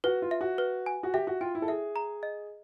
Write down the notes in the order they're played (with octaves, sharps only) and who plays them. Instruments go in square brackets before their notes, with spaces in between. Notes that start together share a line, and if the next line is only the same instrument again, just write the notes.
[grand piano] F#4 [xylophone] B4
[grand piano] F4
[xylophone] E5
[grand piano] F#4
[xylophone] B4
G#5
[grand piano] F#4
[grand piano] G4 [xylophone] E5
[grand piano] F#4
[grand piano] F4 [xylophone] G5
[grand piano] E4
A4
[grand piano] G#4 [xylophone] E5
[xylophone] A#5
D#5